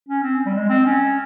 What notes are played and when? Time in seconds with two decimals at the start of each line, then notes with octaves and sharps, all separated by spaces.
0.09 C#4
0.24 C4
0.46 G3
0.55 G#3
0.70 C4
0.86 C#4